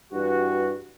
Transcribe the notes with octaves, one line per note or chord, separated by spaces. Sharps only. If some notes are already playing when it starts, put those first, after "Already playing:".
G2 E3 G3 F#4